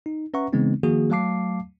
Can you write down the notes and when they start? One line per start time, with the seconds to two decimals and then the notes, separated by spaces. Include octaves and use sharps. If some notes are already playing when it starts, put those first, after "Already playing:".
0.06 D#4
0.34 C#4 B4 E5 F#5 A#5 C#6
0.53 C#3 E3 G#3 B3 C4 D#4
0.83 D#3 F3 A#3 F#4 G#4
1.10 F#3 A3 F5 A5 D6 C7